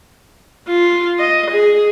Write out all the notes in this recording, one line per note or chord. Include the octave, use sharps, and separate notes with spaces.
F4
D#5
G#4